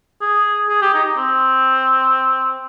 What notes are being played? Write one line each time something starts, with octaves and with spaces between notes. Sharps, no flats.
G#4
G#4
G4
D#4
C4